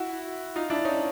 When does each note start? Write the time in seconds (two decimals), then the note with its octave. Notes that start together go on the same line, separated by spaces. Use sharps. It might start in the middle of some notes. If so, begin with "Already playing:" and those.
Already playing: E4 F#4
0.56 D#4 F4
0.70 D4 E4
0.85 C#4 D#4